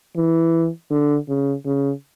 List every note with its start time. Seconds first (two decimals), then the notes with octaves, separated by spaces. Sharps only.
0.16 E3
0.91 D3
1.29 C#3
1.66 C#3